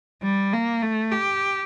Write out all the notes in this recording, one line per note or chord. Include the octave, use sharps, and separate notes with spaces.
G3
A#3
A3
G4